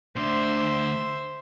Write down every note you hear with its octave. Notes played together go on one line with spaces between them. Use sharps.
D2 D3 C5 E5